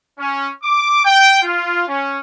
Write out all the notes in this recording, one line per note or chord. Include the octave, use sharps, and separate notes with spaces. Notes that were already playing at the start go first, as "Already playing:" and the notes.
C#4
D6
G5
F4
C#4